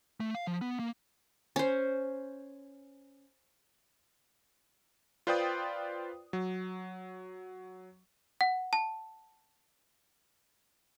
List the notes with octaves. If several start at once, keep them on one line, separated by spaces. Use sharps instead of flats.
A3
F5
F3
B3
A#3
C#4 C5
F4 B4 C5 D5 G5 D#6
F#3
F#5
A5